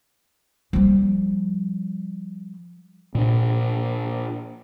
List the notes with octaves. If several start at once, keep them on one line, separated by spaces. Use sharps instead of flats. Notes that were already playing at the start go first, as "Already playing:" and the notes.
F3 G3
A#2 D4